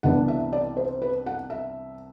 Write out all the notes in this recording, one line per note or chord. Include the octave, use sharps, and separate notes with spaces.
C2 C3 E3 B3 D4 F#5
E5
D5
C5
B4
F#5
E5